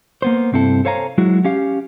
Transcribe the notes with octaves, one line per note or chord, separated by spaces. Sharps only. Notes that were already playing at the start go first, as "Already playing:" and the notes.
A#3 B3 C5
C2 G2 C4 E4 A4
A4 C5 C#5 F5 G#5 A#5
F#3 G#3 E4 F#4
C#4 G4 F5